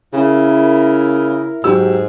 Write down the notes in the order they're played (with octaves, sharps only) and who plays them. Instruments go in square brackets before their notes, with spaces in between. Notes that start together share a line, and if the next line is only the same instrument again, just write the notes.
[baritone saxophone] C#3 [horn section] E4 A#4
[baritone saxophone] G#2 [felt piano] F#3 G4 E6